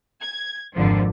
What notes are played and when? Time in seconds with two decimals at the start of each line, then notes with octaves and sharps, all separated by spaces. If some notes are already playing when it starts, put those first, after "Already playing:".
0.21 G#6
0.74 G#1 F2 D3 F3